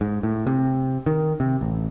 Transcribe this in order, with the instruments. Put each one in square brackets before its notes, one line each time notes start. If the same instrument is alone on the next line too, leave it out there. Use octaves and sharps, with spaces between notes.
[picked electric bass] G#2
A2
C3
D#3
C3
A1